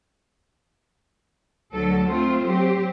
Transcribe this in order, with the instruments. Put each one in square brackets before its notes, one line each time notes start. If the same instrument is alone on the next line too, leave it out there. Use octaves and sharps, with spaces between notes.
[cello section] D2 D3 F#3 A4
A3 C4 F4 C5
F#3 C4 G4